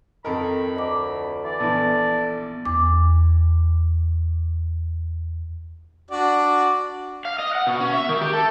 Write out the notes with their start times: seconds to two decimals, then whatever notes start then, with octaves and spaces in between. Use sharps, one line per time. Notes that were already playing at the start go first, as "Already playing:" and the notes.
0.25 F2 D#3 A4 A#4 B5
0.76 D2 D#5 D6
1.44 E3 D5
1.60 A#1 E3 B3 A4
2.65 E2 D6
6.11 D4 F#4 D5
7.25 F5
7.39 D#5
7.55 F#5
7.67 B2
7.80 C#4
7.93 E5
8.09 D#3
8.22 G4
8.33 A4